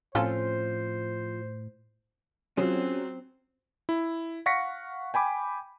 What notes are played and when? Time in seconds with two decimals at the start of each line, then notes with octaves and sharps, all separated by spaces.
0.15 A2 F3 C4 C#4 F4 A4 C5
2.57 F#3 C4 C#4 F4 G#4 C5
3.89 E4
4.46 F5 F#5 C#6 A#6 B6 C#7
5.14 G5 G#5 B5 D6